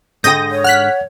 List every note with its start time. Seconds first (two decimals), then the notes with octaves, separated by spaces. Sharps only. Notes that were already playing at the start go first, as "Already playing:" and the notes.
0.24 G#2 D3 G5 D#6 G6 A#6
0.51 C#5
0.64 F#5 F6 F#6 B6